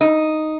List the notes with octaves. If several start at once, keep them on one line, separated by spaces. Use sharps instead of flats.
D#4